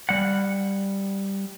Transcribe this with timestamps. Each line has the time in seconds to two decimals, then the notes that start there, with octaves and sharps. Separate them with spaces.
0.09 G3 F#5